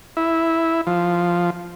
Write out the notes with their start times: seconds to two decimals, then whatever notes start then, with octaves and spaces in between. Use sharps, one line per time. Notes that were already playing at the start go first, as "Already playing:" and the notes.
0.17 E4
0.87 F3